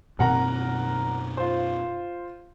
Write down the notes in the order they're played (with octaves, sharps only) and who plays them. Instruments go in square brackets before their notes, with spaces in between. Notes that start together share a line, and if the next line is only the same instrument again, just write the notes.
[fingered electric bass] F#2 B2 C4 [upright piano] A#4 F#5 A#5
[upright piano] F4 C5